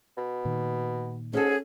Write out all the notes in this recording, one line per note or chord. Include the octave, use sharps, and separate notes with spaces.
B2
A#2 D#3
G#2 C#4 F#4 G#4 A4